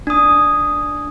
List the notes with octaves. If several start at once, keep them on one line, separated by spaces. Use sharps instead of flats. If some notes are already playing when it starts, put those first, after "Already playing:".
D4 D#6